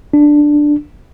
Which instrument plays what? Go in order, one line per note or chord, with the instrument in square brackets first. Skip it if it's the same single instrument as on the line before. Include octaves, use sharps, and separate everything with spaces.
[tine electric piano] D4